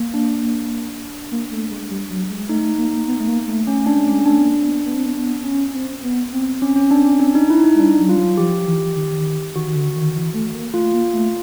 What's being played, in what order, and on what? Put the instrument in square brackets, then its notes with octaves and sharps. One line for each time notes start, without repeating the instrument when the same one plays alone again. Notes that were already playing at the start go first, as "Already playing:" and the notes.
Already playing: [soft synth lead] A#3
[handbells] D4
[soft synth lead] A#3
A3
G#3
G3
F#3
G#3
[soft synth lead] A3 [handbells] D#4
[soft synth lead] A#3
B3
A3
A#3
A3
[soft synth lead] A3 [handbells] C#4
[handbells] D4
[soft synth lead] G#3
A3
[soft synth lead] G#3 [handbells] C#4
[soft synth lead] A3 [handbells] D4
[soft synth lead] B3
A#3
C4
B3
B3
C4
B3
C#4
C4
B3
C4
[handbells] C#4
C#4
D4
C#4
D4
D#4
E4
D#4
[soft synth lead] G#3
[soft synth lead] G3 [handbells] D4
[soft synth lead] F#3
[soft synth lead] G3 [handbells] F4
[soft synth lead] F#3
[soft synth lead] F3 [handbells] G4
[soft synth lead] E3
D#3
[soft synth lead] D#3 [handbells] F#4
[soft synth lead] D#3
D3
D#3
E3
A3
A#3
[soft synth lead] A3 [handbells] F4
[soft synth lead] A#3
A3